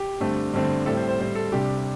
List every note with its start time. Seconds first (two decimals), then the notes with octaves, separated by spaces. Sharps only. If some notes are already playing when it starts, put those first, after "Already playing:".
Already playing: G4
0.20 G2 D3 A3 C4
0.54 G2 D3 A3 C4
0.86 A2 G3 C4 A4
0.97 C5
1.08 C5
1.19 A2 G3 C4 C5
1.35 A4
1.52 C2 C3 G3 D4 G4